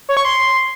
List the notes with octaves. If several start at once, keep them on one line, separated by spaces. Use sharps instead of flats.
C#5
C#6
C6